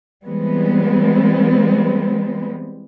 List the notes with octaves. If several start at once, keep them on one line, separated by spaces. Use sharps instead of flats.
E3 G3 G#3 B3 C4